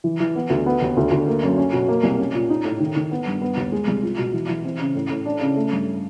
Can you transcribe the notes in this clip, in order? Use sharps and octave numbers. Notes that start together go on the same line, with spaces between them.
E3
E3
B3
D2
B3
D#2
D2
D2
A#3
F#2
C#4
B2
A#3
C2
C#4
A#2
D#4
A2
D#3
D#3
B3
G2
B3
D#2
G#3
C2
F4
B2
E3
E3
C4
C#3
A2
A2
D4
C#3
A3
G2